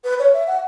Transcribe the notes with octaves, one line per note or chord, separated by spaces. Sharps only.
B4
C#5
E5
F#5